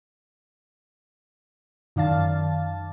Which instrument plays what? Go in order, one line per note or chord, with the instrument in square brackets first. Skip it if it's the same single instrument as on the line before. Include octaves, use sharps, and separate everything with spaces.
[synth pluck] F#2 D#3 D5 F5 A5 A6